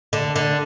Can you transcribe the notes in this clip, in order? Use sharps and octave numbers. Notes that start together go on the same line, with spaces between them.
D3
D3